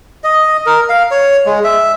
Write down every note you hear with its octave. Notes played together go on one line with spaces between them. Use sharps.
D#5
A#4
F5
C#5
G#3
E5